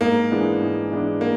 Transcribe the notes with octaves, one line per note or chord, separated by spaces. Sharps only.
G#2 A#3
E3 G#3 B3 D4
G#2
E3 G#3 B3 D4
A#3